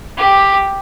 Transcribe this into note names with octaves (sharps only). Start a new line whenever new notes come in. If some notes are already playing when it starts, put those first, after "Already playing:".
G4